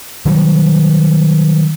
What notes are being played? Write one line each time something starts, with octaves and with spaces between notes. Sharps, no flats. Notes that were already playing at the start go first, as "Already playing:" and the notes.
D#3 F#3 G3